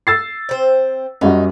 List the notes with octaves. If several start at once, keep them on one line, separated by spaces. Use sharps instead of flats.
E6 A6 C7
C4 C5
F#2 G3 D#4 F#4